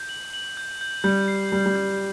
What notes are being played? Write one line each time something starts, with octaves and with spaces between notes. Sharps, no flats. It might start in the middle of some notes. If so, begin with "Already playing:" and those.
Already playing: G6
F#7
F#7
G6
G6
G3 G6
C7
G3 C7
G3
G6